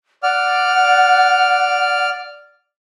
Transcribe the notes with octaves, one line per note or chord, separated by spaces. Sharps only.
D5 F#5 F6